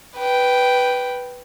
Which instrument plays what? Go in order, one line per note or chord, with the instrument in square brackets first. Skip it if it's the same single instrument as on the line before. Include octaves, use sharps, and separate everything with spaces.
[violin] B4 G5